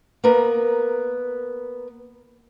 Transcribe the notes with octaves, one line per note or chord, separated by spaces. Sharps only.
A#3 B3 A#4 B4